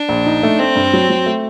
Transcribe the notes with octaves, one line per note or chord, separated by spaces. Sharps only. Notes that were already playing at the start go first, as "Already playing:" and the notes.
Already playing: D4
A#1
D#4
A3
A3 C4
G2
F#3
F#3
A3